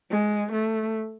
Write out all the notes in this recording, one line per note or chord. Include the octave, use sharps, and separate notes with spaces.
G#3
A3